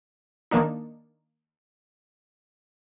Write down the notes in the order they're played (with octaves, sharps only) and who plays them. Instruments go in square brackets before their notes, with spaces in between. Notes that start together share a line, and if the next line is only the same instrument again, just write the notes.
[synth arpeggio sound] D#3 A#3 D4 D#4